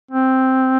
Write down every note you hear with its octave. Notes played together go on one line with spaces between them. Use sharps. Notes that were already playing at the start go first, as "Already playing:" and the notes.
C4